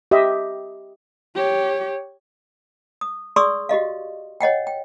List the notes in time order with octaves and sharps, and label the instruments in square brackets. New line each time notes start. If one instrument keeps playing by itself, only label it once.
[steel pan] G4 D#5 E5
[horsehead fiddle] G4 C#5
[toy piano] D#6
G#4 D5 C6 C#6 D#6 E6
F#4 G4 D#5 F5
C#5 D#5 F#5 G5
G5